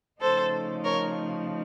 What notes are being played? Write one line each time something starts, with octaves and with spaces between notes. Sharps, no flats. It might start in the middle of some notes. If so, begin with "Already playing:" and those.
C#3 F3 A3 D#4 A4 C5
A#4 C#5